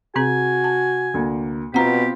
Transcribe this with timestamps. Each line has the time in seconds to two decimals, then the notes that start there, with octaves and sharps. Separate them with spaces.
0.16 C3 C4 F#4 G#4 G#5
0.64 A5
1.14 D2 A#3
1.74 B2 B3 C4 F4 G4 F#5 A#5